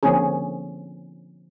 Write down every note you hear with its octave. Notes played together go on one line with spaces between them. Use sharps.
D3 F3 A#3 C4 C#4 G#4